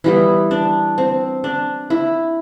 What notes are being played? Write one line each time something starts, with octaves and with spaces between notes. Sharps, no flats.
E3 G3 B3 E4
D4
C4
D4
E4